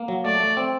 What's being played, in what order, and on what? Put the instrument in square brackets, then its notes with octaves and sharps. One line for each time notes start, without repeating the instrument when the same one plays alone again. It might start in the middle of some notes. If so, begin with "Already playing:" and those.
Already playing: [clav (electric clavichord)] A#3
F#3
[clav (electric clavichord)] A3 [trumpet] D5
[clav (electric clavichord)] A3
C4